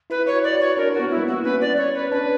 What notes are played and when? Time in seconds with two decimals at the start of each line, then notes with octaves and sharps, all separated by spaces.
0.10 E4 B4
0.26 E4 C#5
0.33 F#4
0.44 D5
0.55 F#4
0.61 C#5
0.77 D4 A#4
0.94 F#4
0.99 B3
1.11 E4
1.17 G3
1.21 A#3
1.28 F#4
1.44 C#4 B4
1.61 D5
1.78 C#5
1.95 B4
2.12 D4 B4